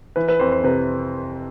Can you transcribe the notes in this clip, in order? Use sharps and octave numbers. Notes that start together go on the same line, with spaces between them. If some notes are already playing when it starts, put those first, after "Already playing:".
E3 B4
B4
F2 C5
C5
C3 B4